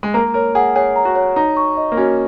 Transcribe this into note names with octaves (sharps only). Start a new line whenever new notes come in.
G#3
A#3 A#5
A#4 C#5
G#4 F#5
G#4 C#5
A#5
F#4
C#5
D#4 A#5
C#6
D#5
A#3
C#4 F#4